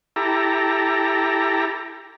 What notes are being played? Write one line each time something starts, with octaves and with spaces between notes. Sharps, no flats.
E4 G4 A4 A#5